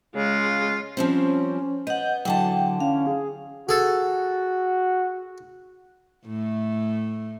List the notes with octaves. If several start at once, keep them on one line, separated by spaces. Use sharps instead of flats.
C#3 G#3 F4
F3 G3 C4 C#4
B3 D#5 F#5 G6
E2 D3 F#3 F#5 G5 A5
C#4 F5
G#4
F#4 G#4 A4
A2 A3